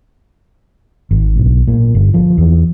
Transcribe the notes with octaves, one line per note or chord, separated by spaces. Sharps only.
G#1
B1
A#2
G1
F3
E2